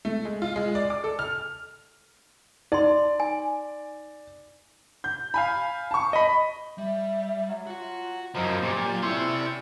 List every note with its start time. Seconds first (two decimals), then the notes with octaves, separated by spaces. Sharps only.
0.05 A3
0.25 G#3
0.42 F4
0.56 G#3
0.75 D5
0.90 D6
1.04 A4
1.19 F6
2.72 D#4 D5 C6
3.20 G#5
5.04 G6
5.34 F5 G#5 B5
5.91 A5 C#6
6.13 D#5 B5
6.78 G3 E5
7.48 F#3
7.67 F4 F#4 F#5
8.35 F#2 F3 F#3 D#4 E4 A#4 D#5
8.62 A#2 G4 C5 D5
9.02 C#4 E4 G4 A4 D5 C6 C#6